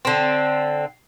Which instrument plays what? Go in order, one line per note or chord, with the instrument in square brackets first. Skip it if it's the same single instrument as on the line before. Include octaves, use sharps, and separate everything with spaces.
[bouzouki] D3 C4